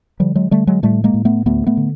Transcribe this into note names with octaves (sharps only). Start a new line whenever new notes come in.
D3 F3 G3
F#3 G#3
D3 G3 A3
F#3 G#3
A2 G3 A3
G#3 A#3
A2
A3 B3
D2 A3 B3
A3 B3
D3